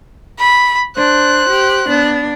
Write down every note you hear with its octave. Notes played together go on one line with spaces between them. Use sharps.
B5
D4 C5 F#6
G4
B3 D4